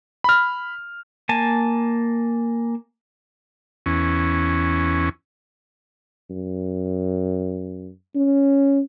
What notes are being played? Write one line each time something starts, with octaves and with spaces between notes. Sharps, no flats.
B5 F6
A#3 G#5 A5
E2 C#4
F#2
C#4